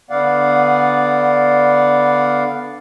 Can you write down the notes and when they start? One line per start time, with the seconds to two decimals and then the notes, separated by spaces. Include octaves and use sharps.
0.10 D3 B3 D5 F5 F#5